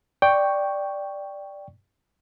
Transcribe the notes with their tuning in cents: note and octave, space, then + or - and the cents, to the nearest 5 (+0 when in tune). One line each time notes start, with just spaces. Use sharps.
D5 +0 G5 +0 C#6 +0